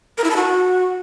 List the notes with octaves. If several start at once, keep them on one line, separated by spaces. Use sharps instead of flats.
A#4
E4
A5
F#4